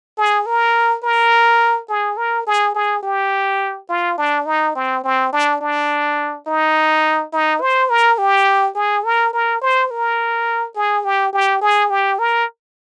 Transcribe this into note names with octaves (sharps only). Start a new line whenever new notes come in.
G#4
A#4
A#4
G#4
A#4
G#4
G#4
G4
F4
D4
D#4
C4
C4
D4
D4
D#4
D#4
C5
A#4
G4
G#4
A#4
A#4
C5
A#4
G#4
G4
G4
G#4
G4
A#4